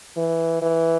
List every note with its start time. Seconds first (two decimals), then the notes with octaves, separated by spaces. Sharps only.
0.17 E3
0.62 E3